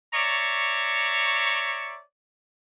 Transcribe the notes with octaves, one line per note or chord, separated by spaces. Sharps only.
C#5 D5 E5 A#5 C#6